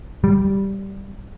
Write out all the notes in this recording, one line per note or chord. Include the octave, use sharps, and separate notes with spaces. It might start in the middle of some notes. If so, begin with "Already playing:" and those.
G3